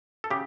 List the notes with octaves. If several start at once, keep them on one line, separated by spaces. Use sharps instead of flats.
A4
C#3 G4